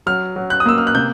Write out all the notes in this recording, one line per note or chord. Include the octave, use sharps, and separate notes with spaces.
F#3 F6
F#3
F#6
D#6
A#3 E6
F6
F#6
C3 G6